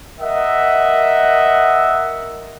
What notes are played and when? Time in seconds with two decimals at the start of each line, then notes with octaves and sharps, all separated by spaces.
0.20 A#4 D#5 E5 F#5